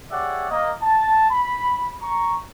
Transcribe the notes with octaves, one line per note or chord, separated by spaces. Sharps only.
G4 G#4 C#5 D5 E5 F#5
A#3 D#5
A5
B5
A#5 C#6